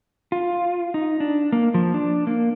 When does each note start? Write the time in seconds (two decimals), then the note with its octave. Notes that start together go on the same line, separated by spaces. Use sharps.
0.32 F4
0.94 D#4
1.20 D4
1.52 A#3
1.74 F3
1.94 D4
2.27 A#3